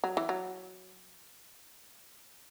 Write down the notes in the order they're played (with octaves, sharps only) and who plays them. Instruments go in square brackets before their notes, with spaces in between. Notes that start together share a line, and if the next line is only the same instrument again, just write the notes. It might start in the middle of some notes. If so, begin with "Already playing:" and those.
[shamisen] F#3
E3
F#3